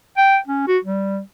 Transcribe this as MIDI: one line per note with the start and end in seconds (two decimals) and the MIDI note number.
0.17 0.37 79
0.47 0.64 61
0.67 0.78 66
0.84 1.19 55